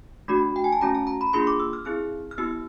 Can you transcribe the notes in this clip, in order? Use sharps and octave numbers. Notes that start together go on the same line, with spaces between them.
A3 D4 F#4 B5
G5
G#5
A5
A3 C#4 F#4 A#5
A5
A#5
B5
A#3 D4 F4 G#4 C6
D6
E6
F6
C4 E4 G#4 F6
F6
B3 E4 G4 E6